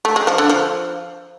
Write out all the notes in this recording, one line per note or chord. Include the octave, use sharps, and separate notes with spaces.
A3
G#3
F3
D3
F3